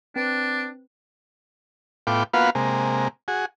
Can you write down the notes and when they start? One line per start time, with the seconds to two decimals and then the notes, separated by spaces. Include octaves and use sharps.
0.16 C4 D4 B4
2.07 A2 B3 F4 G5 D6
2.34 A#3 B3 F4 F#4 B4 F5
2.55 C3 G#3 A#3
3.28 F#4 G#4